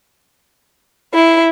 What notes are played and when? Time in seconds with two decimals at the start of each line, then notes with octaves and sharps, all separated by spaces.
1.13 E4